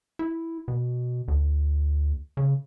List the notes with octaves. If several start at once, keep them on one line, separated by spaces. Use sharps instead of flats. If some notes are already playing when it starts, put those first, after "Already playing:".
E4
B2
D2
C#3